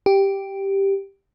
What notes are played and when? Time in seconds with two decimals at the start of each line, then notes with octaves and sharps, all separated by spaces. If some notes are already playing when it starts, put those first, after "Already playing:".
0.06 G4